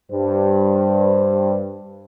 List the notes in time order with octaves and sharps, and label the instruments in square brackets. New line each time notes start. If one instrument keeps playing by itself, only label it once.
[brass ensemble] G2 [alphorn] C5